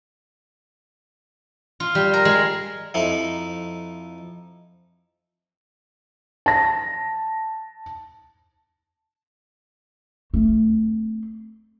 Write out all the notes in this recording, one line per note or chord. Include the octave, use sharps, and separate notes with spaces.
F4
G3
A#4
G#3
F2 D#4 E4
A5 A#6
A3 C4